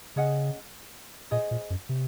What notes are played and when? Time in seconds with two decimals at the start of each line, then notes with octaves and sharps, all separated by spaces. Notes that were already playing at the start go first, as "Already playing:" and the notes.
0.16 C#3 C#4 G#4 D#5 F#5
1.31 A#2 G#4 C5 D#5
1.51 A#2
1.70 F#2
1.89 C3